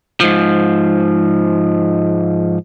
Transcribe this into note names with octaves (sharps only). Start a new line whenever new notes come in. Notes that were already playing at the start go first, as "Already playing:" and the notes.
G#2 F3